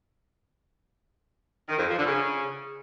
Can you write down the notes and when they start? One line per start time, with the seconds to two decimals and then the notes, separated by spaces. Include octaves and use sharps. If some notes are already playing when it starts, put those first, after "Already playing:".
1.69 D#3
1.78 F2
1.88 F3
1.97 D3
2.07 C#3